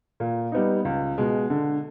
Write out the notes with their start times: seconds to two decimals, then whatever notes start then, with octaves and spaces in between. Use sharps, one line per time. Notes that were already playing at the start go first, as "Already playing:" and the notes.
0.20 A#2
0.52 G3 B3 D#4
0.85 C#2
1.18 B2 G#3
1.50 D3